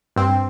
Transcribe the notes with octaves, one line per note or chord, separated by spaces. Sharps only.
G2 C4